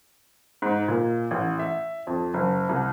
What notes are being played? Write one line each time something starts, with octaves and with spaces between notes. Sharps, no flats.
G#2
A#2
A1
E5
F2
F#1
C2